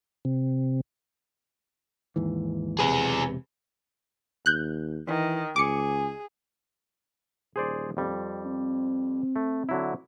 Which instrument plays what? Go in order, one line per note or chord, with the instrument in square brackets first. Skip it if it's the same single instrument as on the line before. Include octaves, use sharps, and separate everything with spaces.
[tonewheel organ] C3
[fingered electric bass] D#2 G#2 E3
[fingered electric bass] E1 C3 [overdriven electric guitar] G#4 B4
[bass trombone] D#2 [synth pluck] F#6 G6
[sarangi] D#3 [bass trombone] E3
[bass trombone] C#2 [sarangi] G#4 [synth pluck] D6 C#7
[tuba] D#1 [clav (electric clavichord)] G#4 C5 D5
[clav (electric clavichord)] F2 G3
[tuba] C4
[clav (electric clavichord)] A3
D3 F#3 E4